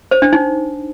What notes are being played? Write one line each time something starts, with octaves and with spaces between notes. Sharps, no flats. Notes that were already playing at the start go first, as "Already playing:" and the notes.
C5
D4
D#4